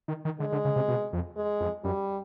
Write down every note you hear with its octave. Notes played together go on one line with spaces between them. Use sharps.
D#3
D#3
D3 G#3
D3
C#3
C3
B2
F2
G#3
F2
F#2 G3